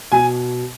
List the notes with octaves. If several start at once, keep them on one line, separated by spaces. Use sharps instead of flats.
B2 G#5